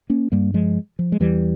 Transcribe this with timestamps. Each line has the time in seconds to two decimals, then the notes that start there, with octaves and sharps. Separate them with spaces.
0.10 A#3 C#4
0.32 G2 G3 A#3
0.54 F3 G#3
0.99 F3
1.12 G#3
1.20 E2 E3 G3